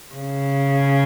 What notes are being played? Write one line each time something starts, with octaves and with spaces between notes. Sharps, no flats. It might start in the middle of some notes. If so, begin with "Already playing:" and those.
C#3